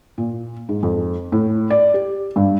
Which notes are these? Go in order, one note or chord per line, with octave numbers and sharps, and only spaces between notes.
A#2
G#2
F2
A2
D5
G4
G2